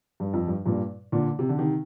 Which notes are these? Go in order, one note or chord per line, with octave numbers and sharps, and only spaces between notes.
G2
F2
G2
G2 A#2
A#2 D3
C3
D3
C3 D#3